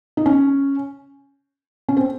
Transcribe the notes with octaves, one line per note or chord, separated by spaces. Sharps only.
D#4
C#4
C#4
C4